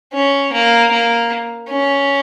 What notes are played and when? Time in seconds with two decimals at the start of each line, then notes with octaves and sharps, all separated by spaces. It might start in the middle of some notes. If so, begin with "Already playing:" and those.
0.14 C#4
0.53 A#3
0.92 A#3
1.69 C#4